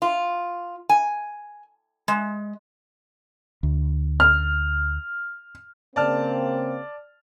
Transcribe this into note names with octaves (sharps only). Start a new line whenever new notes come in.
F4
G#5
G#3
D2
F6
C#3 A#3 C4 D5 A5 F6